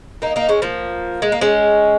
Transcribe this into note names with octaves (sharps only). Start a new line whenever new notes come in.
A#3 D#4
A#3 D#4
G#3 C#4
F3 A#3
G#3
A#3
G#3 C#4